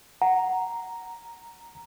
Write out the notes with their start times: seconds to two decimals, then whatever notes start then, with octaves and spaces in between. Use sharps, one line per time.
0.22 F#5 A#5